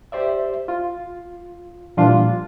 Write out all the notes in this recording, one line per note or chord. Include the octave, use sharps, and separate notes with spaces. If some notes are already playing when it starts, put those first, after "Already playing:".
G4 C5 D5 E5
F4
A#2 E3 F3 G3 D4 F4